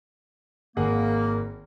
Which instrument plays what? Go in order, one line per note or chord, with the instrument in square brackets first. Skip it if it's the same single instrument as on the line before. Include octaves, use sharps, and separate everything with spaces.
[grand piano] G#1 G#4 F#5 [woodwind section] A#3